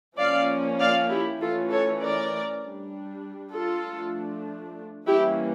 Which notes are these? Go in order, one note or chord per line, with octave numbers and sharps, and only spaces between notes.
F3 A#3 C#4 D5 F5
D5 F5
E4 G4
E3 A3 C#4 F4 A4
A4 C#5
A#4 D5
G3 D4
F4 A4
F3 A3 D4
E3 G3 A#3 C#4 E4 G4